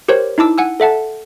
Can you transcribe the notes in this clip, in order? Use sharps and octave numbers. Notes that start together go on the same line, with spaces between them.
G4 A#4 C5 C#5
D#4 E4 A5 D6 E6
F#5 G#5 E6
A4 E5 F#5 A5